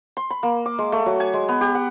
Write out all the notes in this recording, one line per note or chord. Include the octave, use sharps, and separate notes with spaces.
C6
B5
A#3
D6
G#3
A3
F#3
G#5
G#3
B3
G4
F#5